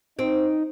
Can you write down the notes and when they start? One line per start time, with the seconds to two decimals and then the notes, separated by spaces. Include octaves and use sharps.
0.19 C4 D#4